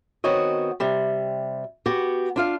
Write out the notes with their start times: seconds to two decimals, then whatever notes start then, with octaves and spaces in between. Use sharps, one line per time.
0.24 D#3 B3 C4 F#4 C#5 D#5
0.80 C3 G3
1.86 B3 F#4 G4
2.36 D4 F4 F5